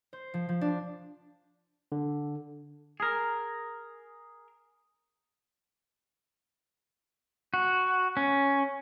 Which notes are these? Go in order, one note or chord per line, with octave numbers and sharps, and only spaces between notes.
C5
F3
F3
D4
D3
G#4 A#4
F#4
C#4